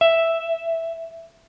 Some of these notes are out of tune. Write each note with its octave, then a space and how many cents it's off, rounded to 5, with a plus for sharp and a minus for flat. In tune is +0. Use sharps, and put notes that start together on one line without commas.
E5 +0